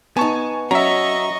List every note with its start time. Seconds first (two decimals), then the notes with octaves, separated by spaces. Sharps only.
0.17 B3 D#4 G#5 A5 C#6
0.71 F#3 C#4 D#5 E5 A#5 C#6